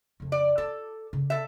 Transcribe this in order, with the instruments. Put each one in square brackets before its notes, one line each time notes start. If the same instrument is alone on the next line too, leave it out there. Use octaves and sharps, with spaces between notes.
[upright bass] F2 C#3
[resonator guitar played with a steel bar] D5
[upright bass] F4 [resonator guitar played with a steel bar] A4
[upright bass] C#3
[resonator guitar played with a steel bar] A4 E5